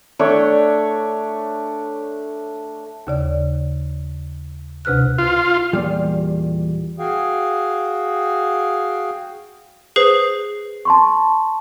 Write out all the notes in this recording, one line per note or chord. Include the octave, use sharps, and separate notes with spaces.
A3 D4 C#5 G5
D#2 C#3 D5
D2 C3 B4 F6 F#6
F4
E2 A#2 G3
F#4 G#4 F5 G5
G#4 B4 C5 C7
A5 C6 C#6